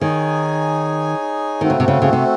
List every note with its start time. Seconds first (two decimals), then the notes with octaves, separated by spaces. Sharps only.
0.01 D#3 D#4 G#4 C#5 G#5
1.61 D#3 A3 C4 F#4
1.70 C#3
1.80 C3
1.88 C#3
2.02 C#3
2.13 C3